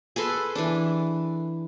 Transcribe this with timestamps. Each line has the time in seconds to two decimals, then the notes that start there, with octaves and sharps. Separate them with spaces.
0.16 G#4 A4 B4 C6
0.55 E3 D4